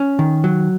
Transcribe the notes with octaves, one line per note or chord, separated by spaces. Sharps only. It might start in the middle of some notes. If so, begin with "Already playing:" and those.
Already playing: C#4
D#3
F#3